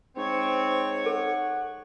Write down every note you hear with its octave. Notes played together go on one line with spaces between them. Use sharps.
G#2 C4 C#5 C#6
A4 F#5